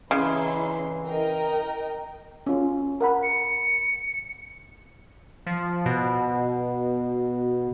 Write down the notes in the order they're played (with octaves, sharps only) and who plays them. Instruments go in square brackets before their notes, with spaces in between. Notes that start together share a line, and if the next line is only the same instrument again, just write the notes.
[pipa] C#3 [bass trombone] E3 [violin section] D#4 E4 C6
[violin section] A#4 D#5 G5
[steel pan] C#4 F4
A#4 F#5 B5
[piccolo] C#7
[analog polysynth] F3
B2